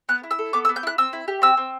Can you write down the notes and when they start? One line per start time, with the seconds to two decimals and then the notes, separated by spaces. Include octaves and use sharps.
0.09 B3 F#6
0.24 E4
0.31 E6
0.39 A4
0.53 B3 D6
0.65 E6
0.69 B3
0.76 G6
0.83 E4 F#6
0.98 C4 E6
1.13 E4
1.28 G4
1.42 C4 E6
1.57 C4